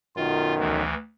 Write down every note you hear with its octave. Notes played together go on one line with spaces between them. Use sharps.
B1 F#2 D#3 F4
D2 E3